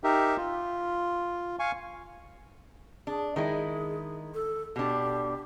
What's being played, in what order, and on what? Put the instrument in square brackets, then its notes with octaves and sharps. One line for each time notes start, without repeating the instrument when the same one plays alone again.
[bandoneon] D#4 G4 A#4 E5
F4
F5 G#5 C#6
[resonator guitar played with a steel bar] D4 [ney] G#4
[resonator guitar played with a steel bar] D#3 G#3 E4 [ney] G#4
[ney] A4
[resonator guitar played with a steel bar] B2 D4 [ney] G4